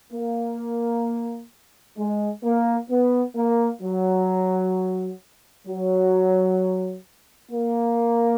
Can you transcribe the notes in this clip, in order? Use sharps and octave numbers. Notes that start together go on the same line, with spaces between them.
A#3
G#3
A#3
B3
A#3
F#3
F#3
A#3